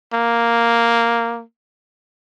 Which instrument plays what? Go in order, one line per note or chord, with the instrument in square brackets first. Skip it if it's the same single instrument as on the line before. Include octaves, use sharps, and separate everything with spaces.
[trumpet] A#3